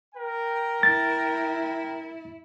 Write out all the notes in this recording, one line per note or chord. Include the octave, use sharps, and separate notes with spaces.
A#4 G5
E4 A6